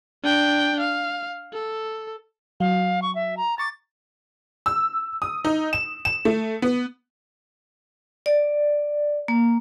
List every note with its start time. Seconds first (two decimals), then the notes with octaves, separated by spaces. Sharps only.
0.23 D4 G5
0.80 F5
1.53 A4
2.60 F#3 F5
3.02 C#6
3.15 E5
3.37 A#5
3.58 A#5 C#6 D6 A6
4.66 E6
5.22 D#6
5.45 D#4
5.73 E7
6.05 E7
6.25 A3
6.62 B3
8.26 D5
9.28 A#3